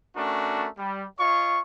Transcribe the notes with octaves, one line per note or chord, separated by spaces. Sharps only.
A3 C#4 D4 F#4 A#4
G3
F4 C#5 D#5 C#6